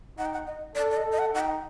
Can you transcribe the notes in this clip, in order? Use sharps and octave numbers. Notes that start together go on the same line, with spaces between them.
D#4 F#5
G5
F#5
D#5
A4 D5
D5
D#5
A4
D#5
F#5
D#4 F#5
G5